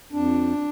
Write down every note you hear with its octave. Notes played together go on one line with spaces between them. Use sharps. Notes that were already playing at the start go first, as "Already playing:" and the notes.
F2 D4